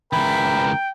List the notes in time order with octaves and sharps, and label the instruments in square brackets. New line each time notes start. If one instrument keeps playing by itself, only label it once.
[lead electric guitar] C#2 E3 [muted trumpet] A#4 [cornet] G5 [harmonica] B5